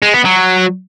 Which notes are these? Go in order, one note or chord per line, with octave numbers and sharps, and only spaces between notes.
G#3
B3
F#3